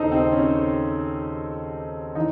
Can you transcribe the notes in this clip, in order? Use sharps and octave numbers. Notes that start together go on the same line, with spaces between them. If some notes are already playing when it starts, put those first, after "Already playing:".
Already playing: D#2 C#3 D#4 A4 C5
C4
C#4
E3 D#4